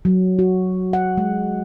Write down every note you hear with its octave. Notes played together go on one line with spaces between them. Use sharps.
F#3
F#4
F#5
G#3